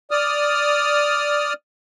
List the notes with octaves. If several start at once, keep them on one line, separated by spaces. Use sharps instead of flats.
D5 D#6 F6